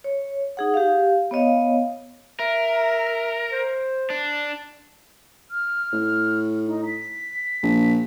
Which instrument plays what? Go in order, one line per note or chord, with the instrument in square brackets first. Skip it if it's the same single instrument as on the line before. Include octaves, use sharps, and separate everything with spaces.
[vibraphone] C#5
D#4 G#4 F#5
G4 F5
B3 C#5 D#5 F5
[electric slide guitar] A#4 [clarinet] E5
[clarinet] C5
[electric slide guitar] D4
[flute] F6
[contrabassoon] A2
[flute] D#4
B6
[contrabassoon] A#1